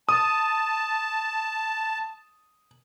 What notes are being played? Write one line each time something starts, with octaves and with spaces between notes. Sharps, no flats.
A5 D#6